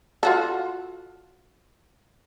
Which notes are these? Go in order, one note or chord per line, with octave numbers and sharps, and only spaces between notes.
F4 F#4 A4